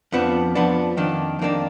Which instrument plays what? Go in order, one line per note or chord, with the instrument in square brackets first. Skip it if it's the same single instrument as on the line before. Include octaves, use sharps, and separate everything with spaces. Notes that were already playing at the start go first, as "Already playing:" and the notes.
[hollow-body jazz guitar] F2 F3 B3 D4
F2 F3 B3 D4
F2 D#3 A#3 D4
F2 D#3 A#3 D4